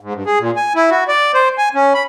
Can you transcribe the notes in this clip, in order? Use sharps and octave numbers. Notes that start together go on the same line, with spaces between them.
G#2
G2
G#4
A#2
G#5
E4
F#4
D5
C5
G#5
C#4
B5